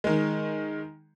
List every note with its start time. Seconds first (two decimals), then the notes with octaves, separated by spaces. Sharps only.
0.04 D#3 G#3